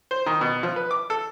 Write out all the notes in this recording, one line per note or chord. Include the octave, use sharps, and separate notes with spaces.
C5
D#3
B2
F3
B4
D6
A4